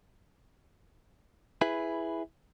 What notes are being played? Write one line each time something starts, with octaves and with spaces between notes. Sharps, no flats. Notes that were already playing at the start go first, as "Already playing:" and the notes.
E4 G#4 B4